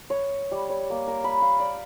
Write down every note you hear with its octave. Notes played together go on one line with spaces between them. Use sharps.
C#5
G3
C#5
A#3
A#4
B5
F5
D5